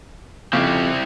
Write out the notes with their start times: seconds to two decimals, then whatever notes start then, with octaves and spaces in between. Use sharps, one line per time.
0.53 F2 C#3 C4 E4 G4